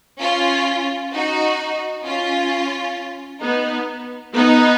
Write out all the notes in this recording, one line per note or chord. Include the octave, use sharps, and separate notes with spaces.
C#4 F4
D#4 F#4
C#4 F4
B3 D#4
B3 D#4